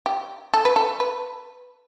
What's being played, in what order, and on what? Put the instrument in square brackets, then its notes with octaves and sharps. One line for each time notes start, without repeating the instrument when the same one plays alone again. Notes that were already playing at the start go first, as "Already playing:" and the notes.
[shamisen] G4
A4
B4
A4
B4